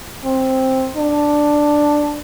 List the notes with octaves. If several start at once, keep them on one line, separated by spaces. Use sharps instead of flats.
C4
D4